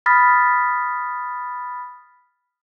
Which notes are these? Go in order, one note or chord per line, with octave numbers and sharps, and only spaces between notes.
B5 D#6 F6 A6 B6